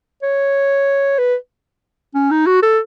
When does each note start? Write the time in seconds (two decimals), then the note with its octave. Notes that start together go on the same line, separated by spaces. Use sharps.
0.23 C#5
1.18 B4
2.14 C#4
2.31 D#4
2.47 F#4
2.62 A4